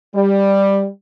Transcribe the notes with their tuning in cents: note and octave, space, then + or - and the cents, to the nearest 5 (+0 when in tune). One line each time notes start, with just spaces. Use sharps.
G3 +10